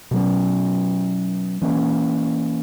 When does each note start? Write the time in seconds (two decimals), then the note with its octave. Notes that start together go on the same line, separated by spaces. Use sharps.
0.11 B2 F#3 C#4
1.62 E3 A#3 C#4